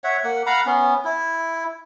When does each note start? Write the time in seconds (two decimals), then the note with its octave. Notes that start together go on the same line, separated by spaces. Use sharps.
0.04 C#5 E5 F#5
0.24 A#3 F#5
0.47 F5 F#5 A#5 B5
0.66 B3 C#4
1.05 E4